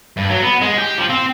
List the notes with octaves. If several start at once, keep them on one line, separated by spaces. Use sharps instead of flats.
G2
F#3
B3
G#3
G4
F3
C4